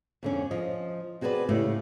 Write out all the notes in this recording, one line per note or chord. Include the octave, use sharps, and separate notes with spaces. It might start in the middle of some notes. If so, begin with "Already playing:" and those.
F2 D3 C#4
F3 D#5
C4 F#4 G#4 A#4 B4 D5
A2 C#3 A3 G4